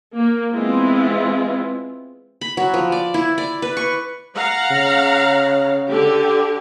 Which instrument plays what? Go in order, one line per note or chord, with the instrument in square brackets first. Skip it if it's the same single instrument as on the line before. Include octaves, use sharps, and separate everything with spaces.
[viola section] A#3
E3 G#3 B3 C4 E4 F4
[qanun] B5
F#3
F3
D5
E4
D5
B4
C#6
[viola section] F5 F#5 A#5
[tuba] C#3
[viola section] D3 G4